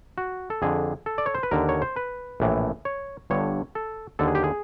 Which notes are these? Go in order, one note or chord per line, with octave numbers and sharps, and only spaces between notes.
F#4
A4
F2 D3 G#4
A4
D5
C#5
C5
B4
D#2 D3 A#4
C#5
C5
B4
A#1 A2 E3
C#5
G1 G2 D3 C#5
A4
D#2 D3 A4
G#4
G4
G#4